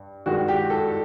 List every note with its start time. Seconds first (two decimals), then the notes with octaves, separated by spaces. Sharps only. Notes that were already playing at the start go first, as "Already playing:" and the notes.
Already playing: G2
0.26 G2 D#3 G#3 F#4
0.48 G4
0.70 A4